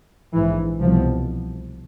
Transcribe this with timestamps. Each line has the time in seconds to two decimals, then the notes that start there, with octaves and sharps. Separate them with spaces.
0.34 A#1 G#2 E3
0.81 C2 B2 F3